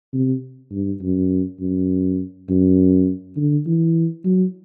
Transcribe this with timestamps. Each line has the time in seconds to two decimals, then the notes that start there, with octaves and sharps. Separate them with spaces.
0.14 C3
0.72 G2
1.02 F#2
1.60 F#2
2.49 F#2
3.37 D3
3.66 E3
4.25 F#3